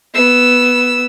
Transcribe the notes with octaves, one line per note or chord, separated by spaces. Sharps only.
B3 E6